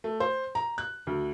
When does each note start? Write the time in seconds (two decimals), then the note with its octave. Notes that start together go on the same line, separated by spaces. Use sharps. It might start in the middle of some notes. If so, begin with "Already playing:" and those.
0.04 A3
0.20 C5
0.55 A#5
0.78 F#6
1.07 D2